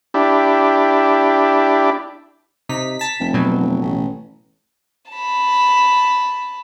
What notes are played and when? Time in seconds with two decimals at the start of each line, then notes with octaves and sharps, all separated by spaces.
0.14 D4 E4 G4
2.69 C3 D#4 B6
2.99 A5 B6
3.20 F1
3.34 B2 F#3
3.60 F1
3.82 A1
5.11 A5 B5